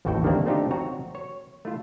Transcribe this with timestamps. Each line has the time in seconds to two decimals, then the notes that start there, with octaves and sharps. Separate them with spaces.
0.05 A1 D#2 A2 F#4 A4 G5
0.24 D3 D#3 G3 A3 A#3 C4
0.46 A3 C4 D4 D#4 F4 G4
0.71 C4 F#4 C#5 A#5
1.15 C#5
1.65 A3 E4 F4